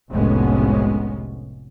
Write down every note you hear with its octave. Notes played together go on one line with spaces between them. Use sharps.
F1 C2 A2 G#3 B3 C#4